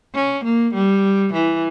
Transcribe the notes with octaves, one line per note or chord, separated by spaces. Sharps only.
C#4
A#3
G3
E3